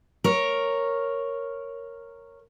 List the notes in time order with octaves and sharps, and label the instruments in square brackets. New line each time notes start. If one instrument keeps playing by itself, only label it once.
[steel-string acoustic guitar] A#4 C#5